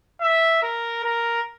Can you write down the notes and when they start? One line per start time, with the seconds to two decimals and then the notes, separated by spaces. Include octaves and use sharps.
0.21 E5
0.63 A#4
1.04 A#4